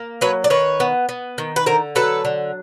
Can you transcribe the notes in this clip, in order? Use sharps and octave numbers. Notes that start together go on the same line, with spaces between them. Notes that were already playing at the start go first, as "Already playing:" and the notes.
Already playing: A#3
F#3 B4 C#5
D5
D#3 B4 C#5
B3
B3
D#3
B4
D3 A#4 C5
F#3 A4 B4
D3